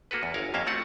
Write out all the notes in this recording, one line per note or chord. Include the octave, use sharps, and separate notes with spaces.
A#3 F#4 A4 B4
E2
G1 A#4 C#5 F5
F2 A#3 C#4 E5 F5
A3 C4 F4 F#4 F#5